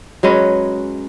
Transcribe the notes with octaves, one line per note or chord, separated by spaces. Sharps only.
F#3 G#3 C#4 B4